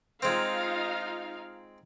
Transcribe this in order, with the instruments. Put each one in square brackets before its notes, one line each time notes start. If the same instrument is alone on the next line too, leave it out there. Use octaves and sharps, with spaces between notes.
[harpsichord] G#3 C4 [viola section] D#4 F4 F5